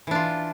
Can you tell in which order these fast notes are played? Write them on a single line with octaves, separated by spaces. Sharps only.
E3 D4 F4